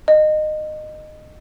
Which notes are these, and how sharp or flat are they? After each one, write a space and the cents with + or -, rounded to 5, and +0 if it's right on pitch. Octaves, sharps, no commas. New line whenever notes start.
D#5 -20